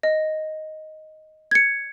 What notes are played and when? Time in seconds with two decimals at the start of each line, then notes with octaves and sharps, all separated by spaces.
0.03 D#5
1.51 G#6 C#7